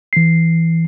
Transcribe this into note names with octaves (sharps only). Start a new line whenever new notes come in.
E3 C7